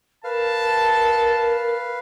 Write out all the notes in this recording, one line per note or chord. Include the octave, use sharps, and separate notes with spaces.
A#4 B4 F5 A5